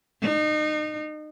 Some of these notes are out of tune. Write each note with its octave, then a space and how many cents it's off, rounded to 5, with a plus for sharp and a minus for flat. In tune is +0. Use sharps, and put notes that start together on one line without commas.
D#4 -30